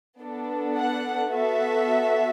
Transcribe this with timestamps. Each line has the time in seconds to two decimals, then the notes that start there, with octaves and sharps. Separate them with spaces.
0.22 B3 D4 A4
0.77 F#5
1.32 B3 F#4 A4 E5